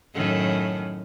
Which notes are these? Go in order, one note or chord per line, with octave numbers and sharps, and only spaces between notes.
F#2 A2 D#3